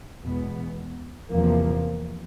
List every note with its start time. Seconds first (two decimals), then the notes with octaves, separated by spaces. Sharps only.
0.22 E2 B2 G#3 B3
1.32 E2 C3 F3 A#3